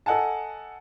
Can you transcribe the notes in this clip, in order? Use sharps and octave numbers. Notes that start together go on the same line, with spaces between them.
A4 D#5 F#5 G#5 A5